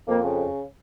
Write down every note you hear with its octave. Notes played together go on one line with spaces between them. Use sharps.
F2 A#3
C#3